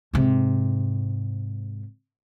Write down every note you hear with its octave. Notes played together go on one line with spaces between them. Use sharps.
G#2 C3